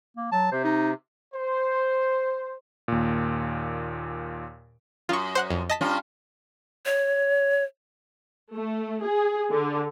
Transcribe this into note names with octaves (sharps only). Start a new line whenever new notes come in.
A#3
F#3 A5
C3 C5
D#4
C5
D#2 A#2
F#2 F4 C#6
C5 F#5 F#6
F2
D#5 A5 B6
G2 C#4 F4
C#5
A3
G#4
D3